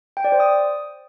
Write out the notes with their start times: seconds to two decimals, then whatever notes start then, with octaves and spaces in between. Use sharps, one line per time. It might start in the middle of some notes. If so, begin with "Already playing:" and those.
0.17 G5
0.24 D5
0.32 C5
0.40 D#6